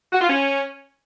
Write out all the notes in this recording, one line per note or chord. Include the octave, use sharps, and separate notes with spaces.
F#4
F4
C#4